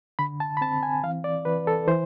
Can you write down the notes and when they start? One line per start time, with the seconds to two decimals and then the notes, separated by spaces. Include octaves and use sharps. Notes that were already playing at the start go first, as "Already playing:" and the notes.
0.19 D3 B5
0.40 A5
0.57 B5
0.61 C4 A5
0.83 G#5
1.04 E3 F5
1.24 D5
1.45 E3 B4
1.67 A4
1.88 E3 C5